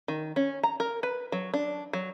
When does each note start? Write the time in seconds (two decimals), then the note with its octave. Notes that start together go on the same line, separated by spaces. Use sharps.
0.08 D#3
0.36 C#4
0.63 A#5
0.80 A#4
1.03 B4
1.32 F#3
1.54 D4
1.93 F#3